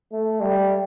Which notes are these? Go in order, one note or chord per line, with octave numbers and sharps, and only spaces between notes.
A3
G3